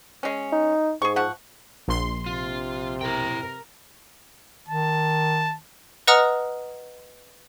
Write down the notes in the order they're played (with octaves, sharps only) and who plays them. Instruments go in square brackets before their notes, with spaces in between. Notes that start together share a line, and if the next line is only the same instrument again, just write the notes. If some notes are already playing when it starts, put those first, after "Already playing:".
[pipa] G#3 C#4
[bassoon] D#4
[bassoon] G#2 [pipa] G#4 C#6
[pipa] F3 F#5 C#6
[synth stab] A#1 C6
[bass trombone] C3 [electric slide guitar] F4
[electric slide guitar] E4 G5 [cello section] A#4
[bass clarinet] D#3 [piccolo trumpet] A5
[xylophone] B4 D#5 F#5 A#5 D#6 F6